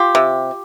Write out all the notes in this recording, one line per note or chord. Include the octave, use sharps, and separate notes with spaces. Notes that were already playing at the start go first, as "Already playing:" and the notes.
Already playing: F4 G4
C3